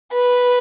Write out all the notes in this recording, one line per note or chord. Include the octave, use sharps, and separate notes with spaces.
B4